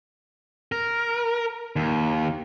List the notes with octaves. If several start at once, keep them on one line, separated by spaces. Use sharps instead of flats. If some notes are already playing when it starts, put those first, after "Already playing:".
A#4
D#2